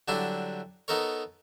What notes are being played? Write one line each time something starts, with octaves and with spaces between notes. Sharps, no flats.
D3 F#3 G3 D4 E4
B3 D#4 A4 A#4 C#5